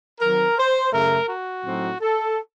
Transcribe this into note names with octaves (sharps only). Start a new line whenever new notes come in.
D#3 F#3 C4 A#4
C5
F#2 C#3 A3 A#4
F#4
A2 F#3 C4 D#4
A4